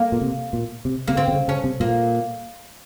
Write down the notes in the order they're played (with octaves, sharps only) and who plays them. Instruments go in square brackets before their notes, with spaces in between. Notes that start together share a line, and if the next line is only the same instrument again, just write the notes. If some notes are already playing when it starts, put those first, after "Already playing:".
Already playing: [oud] A#3
[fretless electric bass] A#2
C3
A#2
C3
[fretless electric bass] C3 [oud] A#3
[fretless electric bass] C#3 [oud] C4
[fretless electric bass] C3
C#3
[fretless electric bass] C#3 [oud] C#4
[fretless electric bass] C3
[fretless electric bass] A#2 [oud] A#3